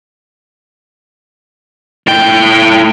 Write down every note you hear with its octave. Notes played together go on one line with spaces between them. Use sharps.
A2 G5